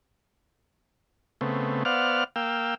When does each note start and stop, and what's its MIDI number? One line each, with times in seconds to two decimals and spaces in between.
1.41 1.83 49
1.41 1.83 57
1.41 1.83 59
1.41 1.83 60
1.85 2.24 59
1.85 2.24 72
1.85 2.24 74
1.85 2.24 77
1.85 2.24 78
1.85 2.24 89
2.36 2.75 58
2.36 2.75 77
2.36 2.75 79
2.36 2.75 88